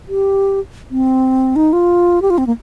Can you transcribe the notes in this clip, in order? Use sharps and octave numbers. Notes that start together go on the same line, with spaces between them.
G4
C4
D#4
F4
G4
F4
C4
A#3